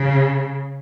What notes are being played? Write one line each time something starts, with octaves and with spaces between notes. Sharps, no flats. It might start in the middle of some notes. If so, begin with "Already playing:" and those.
Already playing: C#3